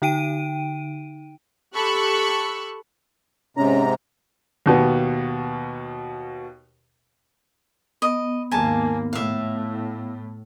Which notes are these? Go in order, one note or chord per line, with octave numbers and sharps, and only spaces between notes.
D3 D#4 G5 D7 D#7
G4 A4 B5 C#6 E6 F#6
G#2 C3 C#4 A#5
D#2 B2 B3
B3 D#5
D#2 G#2 A#3 G#5 A5
A2 E5 F5